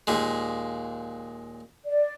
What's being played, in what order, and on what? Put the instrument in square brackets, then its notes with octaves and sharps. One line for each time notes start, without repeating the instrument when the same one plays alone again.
[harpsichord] D#2 A#2 G#3
[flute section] D5